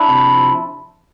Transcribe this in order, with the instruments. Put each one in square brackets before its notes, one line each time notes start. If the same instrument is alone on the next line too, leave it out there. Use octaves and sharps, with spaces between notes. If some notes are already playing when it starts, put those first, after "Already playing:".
Already playing: [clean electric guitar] D4 E4
C3
F3